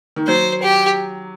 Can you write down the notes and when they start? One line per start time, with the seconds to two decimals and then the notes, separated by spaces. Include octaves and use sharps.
0.16 D#3
0.27 F#3 C5
0.63 G4